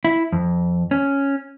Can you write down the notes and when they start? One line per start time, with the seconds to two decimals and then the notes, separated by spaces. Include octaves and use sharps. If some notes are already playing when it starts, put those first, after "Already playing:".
0.05 E4
0.32 F2
0.91 C#4